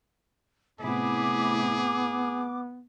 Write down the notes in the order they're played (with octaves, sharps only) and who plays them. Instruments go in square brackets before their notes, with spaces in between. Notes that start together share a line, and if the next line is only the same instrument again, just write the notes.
[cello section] A2 C3 E4 [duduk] B3 [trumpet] G#4 [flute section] D6